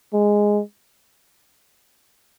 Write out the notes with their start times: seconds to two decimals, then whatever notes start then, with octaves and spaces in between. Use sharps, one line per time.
0.14 G#3